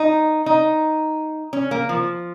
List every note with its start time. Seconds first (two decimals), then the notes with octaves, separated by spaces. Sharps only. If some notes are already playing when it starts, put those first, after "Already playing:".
Already playing: D#4
0.46 D#4
1.53 C#4
1.71 A#3
1.89 F3